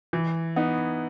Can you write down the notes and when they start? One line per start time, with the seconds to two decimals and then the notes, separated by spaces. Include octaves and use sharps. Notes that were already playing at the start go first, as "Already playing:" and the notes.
0.13 E3
0.56 B3 D#4